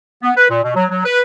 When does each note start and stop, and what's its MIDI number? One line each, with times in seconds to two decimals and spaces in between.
0.22 0.31 59
0.37 0.46 71
0.50 0.61 46
0.63 0.73 47
0.75 0.85 54
0.90 1.05 54
1.05 1.21 71